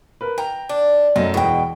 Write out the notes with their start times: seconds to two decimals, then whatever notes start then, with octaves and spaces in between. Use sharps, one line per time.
0.21 A#4 B4
0.38 G5 A#5
0.69 D4
1.16 F#2 A3 D#4
1.34 E2 B2 G#3 G5